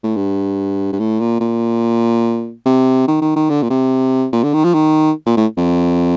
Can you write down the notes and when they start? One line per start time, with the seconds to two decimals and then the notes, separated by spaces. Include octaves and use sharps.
0.03 A2
0.16 G2
0.92 G2
0.99 A2
1.20 A#2
1.40 A#2
2.65 C3
3.08 D#3
3.21 D#3
3.36 D#3
3.49 D3
3.62 A#2
3.70 C3
4.32 A#2
4.43 D3
4.53 D#3
4.64 F3
4.74 D#3
5.26 A#2
5.37 A2
5.57 F2